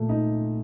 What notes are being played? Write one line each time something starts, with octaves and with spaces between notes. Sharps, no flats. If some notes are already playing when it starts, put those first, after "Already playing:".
Already playing: A#2 A3
D#4